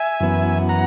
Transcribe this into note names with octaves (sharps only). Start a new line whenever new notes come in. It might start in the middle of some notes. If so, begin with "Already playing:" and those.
Already playing: E5 G#5
F#2 E3 B3
F#5 A#5